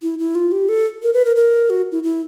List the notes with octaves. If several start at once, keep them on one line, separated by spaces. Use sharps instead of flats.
E4
E4
F4
G4
A4
A#4
B4
A#4
A#4
F#4
E4
E4